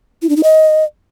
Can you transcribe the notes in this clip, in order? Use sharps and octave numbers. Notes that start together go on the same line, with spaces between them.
E4
D4
D#4
D#5